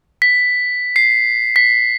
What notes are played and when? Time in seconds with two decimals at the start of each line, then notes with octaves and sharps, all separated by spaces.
0.22 B6
0.96 C7
1.56 B6